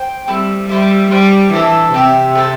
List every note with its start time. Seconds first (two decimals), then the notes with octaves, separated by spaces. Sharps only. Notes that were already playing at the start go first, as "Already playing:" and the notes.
Already playing: C5 G5
0.28 G3 A3 C4 E4
0.69 G3 E4 C5 E5
1.11 G3 D4 G4 C5
1.53 E3 D4 A4 E5
1.94 C3 C4 G4 E5
2.35 A3 C4 A4